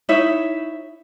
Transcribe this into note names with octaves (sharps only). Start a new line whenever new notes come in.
D#4 E4 C#5 E5